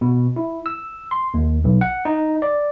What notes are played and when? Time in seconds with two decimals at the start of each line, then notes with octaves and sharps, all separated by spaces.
0.01 B2
0.36 E4
0.66 E6
1.11 C6
1.34 D#2
1.64 B1
1.81 F#5
2.05 D#4
2.42 D5